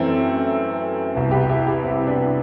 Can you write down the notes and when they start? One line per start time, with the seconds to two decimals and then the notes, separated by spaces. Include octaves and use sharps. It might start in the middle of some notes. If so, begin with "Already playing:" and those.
Already playing: F#2 E3 A3 C4
1.15 C2 B2
1.31 G4 B4
1.49 E4 G4
1.67 E4 G4
1.84 C4 E4
2.07 B3 D4